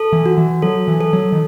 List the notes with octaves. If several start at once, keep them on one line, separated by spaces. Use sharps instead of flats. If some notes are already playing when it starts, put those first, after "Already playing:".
Already playing: A4
E3
F#4
E3
F#3 A4
E3
A4
F#3
D#3